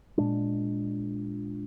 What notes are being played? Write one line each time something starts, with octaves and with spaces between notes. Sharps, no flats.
A#2 G#3 D4